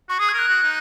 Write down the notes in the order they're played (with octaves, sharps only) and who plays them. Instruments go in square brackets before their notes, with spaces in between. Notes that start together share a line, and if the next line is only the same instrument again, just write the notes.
[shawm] F#4 [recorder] C#6
[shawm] G#4 [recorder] D#6
[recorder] G#6
[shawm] A#4
[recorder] F#6
[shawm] F#4
D#4